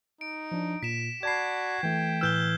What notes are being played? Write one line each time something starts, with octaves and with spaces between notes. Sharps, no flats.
D#4 D7
F3 D4
A#2 B6 E7
F#4 D5 A5 B5 G#6 C7
E3 A3 G5
A2 E3 E6 F6 G6 G7